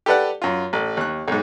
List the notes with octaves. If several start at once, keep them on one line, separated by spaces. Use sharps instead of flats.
G4 A4 B4 D5 F#5
F#2 F4
A1
D#2 F#6
B1 G#2